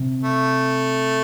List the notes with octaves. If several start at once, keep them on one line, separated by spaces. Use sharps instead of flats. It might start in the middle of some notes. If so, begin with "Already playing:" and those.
Already playing: C3
A3